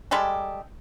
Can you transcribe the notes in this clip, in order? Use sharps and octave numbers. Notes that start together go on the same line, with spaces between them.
G3 G#3 G4 A4